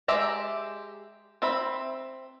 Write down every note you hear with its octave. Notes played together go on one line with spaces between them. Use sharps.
G#3 G4 E5 A#5
C4 E5 B5